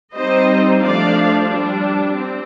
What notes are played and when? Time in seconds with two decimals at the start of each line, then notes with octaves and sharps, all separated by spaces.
0.13 G3 C4 D#4 C5 D#5
0.80 F3 A3 D4 D5 F5
1.48 G3 D4
2.15 C4